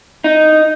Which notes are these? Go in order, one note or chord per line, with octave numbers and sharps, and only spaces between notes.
D#4